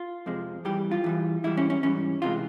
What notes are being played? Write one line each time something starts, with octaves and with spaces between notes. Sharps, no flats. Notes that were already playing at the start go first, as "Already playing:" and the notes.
Already playing: F4
F2 C3 F3 G#3
E2 E3 G3 G4
F4
E2 E3 G3
G#2 E3 G3 E4
C#4
C#4
G#2 E3 G3 C#4
C#2 C3 E3 G#3 F4